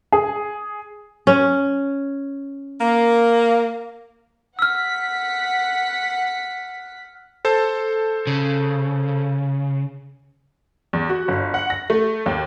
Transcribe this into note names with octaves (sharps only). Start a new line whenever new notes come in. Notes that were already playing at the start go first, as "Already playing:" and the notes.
G#4
C#4
A#3
F#5 E6 F6 B6
A4 C5 A5
C#3
E2
F#4
G1
F#5
A#6
A3
D#2